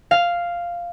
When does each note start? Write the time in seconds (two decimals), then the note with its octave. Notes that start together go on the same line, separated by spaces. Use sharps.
0.11 F5